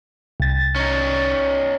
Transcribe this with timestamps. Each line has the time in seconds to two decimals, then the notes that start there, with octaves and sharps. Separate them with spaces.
0.40 C2 A6
0.76 C#4 D#4